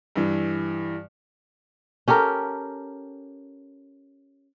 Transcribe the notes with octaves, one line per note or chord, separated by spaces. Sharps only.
G2 E3
C#4 G4 A4 A#4